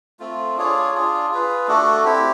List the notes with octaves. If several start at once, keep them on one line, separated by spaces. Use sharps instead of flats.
A3 C4 F4
D4 F4 G#4 C#5
D4 F4 G#4
F4 G#4 B4
A3 D4 F#4 A4
C4 E4 G4